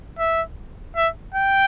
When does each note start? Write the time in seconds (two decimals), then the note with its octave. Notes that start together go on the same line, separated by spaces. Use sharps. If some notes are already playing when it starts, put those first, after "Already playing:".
0.19 E5
0.97 E5
1.34 G5